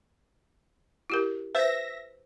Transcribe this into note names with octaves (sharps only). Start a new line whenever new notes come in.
E4 G4 A#4
B4 C5 E5 A#6